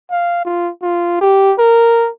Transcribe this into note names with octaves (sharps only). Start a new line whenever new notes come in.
F5
F4
F4
G4
A#4